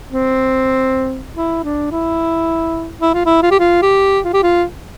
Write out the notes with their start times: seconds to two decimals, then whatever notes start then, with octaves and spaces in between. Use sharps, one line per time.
0.12 C4
1.36 E4
1.64 D4
1.91 E4
3.01 E4
3.14 F4
3.26 E4
3.42 F4
3.51 G4
3.59 F4
3.82 G4
4.25 F4
4.33 G4
4.43 F4